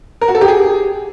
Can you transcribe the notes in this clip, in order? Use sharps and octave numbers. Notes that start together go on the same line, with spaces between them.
A#4
F#4
A4
G4
G#4